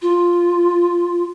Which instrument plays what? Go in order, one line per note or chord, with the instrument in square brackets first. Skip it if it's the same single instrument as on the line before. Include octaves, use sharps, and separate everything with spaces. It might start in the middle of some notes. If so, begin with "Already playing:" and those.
[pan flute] F4